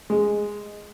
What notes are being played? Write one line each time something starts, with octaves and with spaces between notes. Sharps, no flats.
G#3